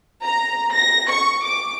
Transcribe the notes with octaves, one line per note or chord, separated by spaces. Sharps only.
A#5
A#6
C#6
D6